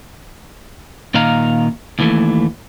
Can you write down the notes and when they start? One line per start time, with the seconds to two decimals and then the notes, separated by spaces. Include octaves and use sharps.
1.14 A#2 D#3 D#5 F5 A#5
1.99 D#2 E3 A3